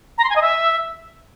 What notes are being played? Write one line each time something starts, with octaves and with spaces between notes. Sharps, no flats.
A#5
C6
G#5
D#5
E5